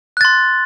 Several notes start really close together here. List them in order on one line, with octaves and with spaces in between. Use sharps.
F#6 A6 C6